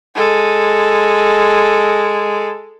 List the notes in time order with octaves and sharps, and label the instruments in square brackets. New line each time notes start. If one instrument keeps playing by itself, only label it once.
[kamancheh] G#3 A4